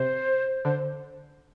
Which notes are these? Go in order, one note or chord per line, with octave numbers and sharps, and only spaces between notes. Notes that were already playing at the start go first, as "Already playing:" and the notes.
Already playing: C3 C5
D3 C5